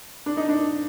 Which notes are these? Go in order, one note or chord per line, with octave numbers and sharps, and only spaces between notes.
D4
D#4
D4